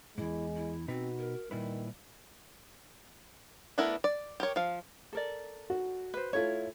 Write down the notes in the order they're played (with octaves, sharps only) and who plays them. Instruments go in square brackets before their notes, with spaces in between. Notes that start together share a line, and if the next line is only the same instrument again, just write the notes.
[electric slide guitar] E2 G#2 [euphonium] G#3 [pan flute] E4
[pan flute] E4
[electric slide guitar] B2 D#4 B4 [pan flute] C4 [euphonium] F#4
[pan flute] A#4
[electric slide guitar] A#2 E4 B4 [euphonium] D#3 [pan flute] G3
[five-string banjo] A3 B3 D4 E4 A#4
D5
G4 A#4 C#5
F3 F5
[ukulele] A4 A#4 D5
[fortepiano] F#4
[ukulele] B4 C5
[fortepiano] A3 F4 A4 [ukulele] E4 C#5